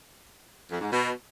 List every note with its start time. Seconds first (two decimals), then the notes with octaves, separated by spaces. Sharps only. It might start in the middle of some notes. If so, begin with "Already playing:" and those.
0.70 F2
0.80 G#2
0.90 B2